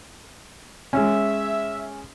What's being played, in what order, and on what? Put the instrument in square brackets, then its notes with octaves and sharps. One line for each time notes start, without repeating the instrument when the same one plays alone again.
[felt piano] G#3 C#4 [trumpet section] E5